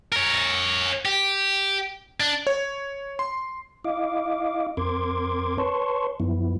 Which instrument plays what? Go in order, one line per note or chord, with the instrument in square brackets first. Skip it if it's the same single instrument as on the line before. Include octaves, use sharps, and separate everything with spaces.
[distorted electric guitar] A#4 C#5
G4
D4
[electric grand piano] C#5
C6
[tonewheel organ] E4 D#5 F5 D6
F2 C4 A#4 C6 D6 G#6
B4 C#5 A5 C6 C#6
F#2 F3 B3 E4